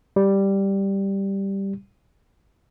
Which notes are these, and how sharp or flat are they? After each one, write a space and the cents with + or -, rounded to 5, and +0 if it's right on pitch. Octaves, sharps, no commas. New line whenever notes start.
G3 +0